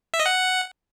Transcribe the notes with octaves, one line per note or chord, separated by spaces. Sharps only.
E5
D#5
F#5